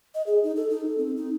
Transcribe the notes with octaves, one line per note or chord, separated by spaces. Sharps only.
D#5
G#4
D#4
A4
D#4
A4
C4
D#4